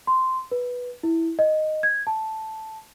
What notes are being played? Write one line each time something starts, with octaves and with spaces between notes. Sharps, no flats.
C6
B4
E4
D#5
G#6
A5